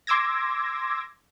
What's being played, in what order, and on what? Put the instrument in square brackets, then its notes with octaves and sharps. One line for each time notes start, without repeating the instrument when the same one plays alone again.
[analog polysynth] C6 D6 E6 G#6 A#6